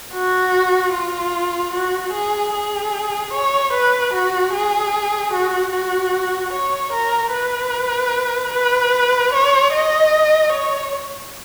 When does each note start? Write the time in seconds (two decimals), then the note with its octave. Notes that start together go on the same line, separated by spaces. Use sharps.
0.14 F#4
0.93 F4
1.74 F#4
2.13 G#4
2.54 G#4
3.34 C#5
3.73 B4
4.14 F#4
4.53 G#4
5.33 F#4
5.73 F#4
6.53 C#5
6.93 A#4
7.33 B4
8.53 B4
9.33 C#5
9.73 D#5
10.53 C#5